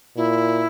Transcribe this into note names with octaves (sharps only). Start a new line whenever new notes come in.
A#2 E4